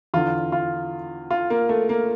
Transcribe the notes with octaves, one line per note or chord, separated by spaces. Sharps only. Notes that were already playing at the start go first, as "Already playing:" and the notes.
E2 D3 F4
F4
F4
A#3
A3
A#3